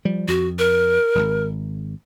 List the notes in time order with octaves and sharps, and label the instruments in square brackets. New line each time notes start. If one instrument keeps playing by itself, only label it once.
[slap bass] F3 G3
[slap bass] F2 [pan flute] F#4
[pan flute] A#4
[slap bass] D#1 G#1